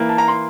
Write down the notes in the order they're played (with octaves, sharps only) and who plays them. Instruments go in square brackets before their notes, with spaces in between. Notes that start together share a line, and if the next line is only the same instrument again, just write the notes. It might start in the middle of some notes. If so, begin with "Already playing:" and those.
Already playing: [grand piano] E3 A#3
A5
A#5
C6